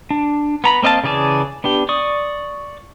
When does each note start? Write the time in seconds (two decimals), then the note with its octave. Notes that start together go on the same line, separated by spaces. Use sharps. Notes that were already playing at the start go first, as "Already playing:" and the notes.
0.11 D4
0.64 B3 A#5 B5
0.82 A#3 C4 D#5 F5 A5
1.04 C#3 E3 G#4 D5 A5
1.64 B3 D4 G4
1.89 D5 C#6 D#6